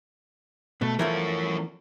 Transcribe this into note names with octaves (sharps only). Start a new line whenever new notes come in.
B2 A3
E3 F3 A3 C#4 A#4